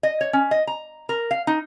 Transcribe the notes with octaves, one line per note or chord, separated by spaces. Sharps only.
D#5
C#5
C#4
D#5
A#5
A#4
F5
D#4